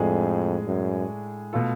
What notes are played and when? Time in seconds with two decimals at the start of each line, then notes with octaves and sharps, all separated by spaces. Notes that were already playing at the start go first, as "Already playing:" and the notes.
Already playing: F2 A2 G#3 D4 G#4
0.67 F#2
1.53 B2 A3 F4 A4